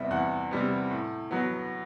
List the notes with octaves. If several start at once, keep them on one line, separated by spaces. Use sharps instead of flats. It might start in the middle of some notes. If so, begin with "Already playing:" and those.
Already playing: E2 C3 G3 B3 E5
E2 F#5
C3 G3 B3
A2
F#3 B3